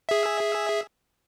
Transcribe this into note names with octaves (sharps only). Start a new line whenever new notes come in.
G#4 E5